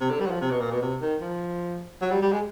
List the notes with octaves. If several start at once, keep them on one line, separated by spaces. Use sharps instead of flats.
C3
D3
G3
F#3
F3
C3
B2
A#2
B2
C3
D#3
F3
F#3
G3
G3
G#3